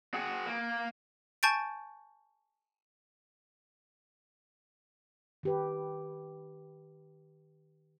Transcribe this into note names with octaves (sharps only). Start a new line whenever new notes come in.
F#4 G#4
A#3
G#5 A5 C#6 G6 A6 D7
D#3 G4 B4